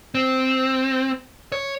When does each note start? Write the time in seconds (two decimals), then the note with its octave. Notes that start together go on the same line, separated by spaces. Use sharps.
0.15 C4
1.52 C#5